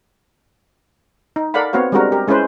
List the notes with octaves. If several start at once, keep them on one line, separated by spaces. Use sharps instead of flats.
D#4
A4 A#4 D5 F5 F#5 B5
B3 C4 F#4 C#5 F5
G3 G#3 C4 D4 F#4 A#4
G4 A#4
G#3 C#4 E4 B4 C5